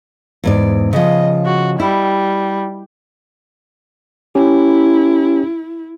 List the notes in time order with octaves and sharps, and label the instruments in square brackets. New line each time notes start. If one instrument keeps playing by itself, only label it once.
[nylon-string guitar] E2 G#2 D5
[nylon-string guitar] C#3 F3 [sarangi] D#5
[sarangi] F#4
[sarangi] G3 [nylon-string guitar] E4
[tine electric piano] C#4 G4 [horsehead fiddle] E4